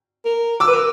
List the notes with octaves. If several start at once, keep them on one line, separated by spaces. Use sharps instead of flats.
A#4
D6 E6
B4
A#4